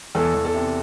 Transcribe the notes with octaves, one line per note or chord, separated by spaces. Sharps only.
E2 A4
E2
A4
C3